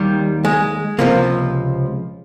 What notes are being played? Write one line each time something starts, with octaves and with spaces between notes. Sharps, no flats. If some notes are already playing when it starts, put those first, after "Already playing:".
Already playing: D#2 D#3 G3
G#3
C#2 C3 F3 A#3